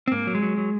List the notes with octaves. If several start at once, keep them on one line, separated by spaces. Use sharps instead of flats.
C4
G#2 A#3
F#3
G#3
F#3
F#3